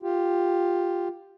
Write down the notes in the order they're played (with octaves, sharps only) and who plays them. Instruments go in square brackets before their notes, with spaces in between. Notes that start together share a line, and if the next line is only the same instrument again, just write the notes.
[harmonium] F4 G4